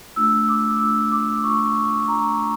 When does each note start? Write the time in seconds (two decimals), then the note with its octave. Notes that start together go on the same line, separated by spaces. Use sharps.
0.16 A3 D4 F4 E6
0.49 D6
0.80 A3 D4 F4 E6
1.12 D6
1.44 A3 D4 F4 C#6
2.08 A3 D4 F4 A#5